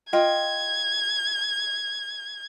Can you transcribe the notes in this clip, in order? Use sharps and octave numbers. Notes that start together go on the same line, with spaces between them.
F4 D#5 G5 G#6